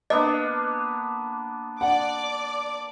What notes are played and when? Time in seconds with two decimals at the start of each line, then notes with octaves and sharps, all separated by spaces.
0.10 A#3 B3 D4 D#5
1.81 D5 F#5 D6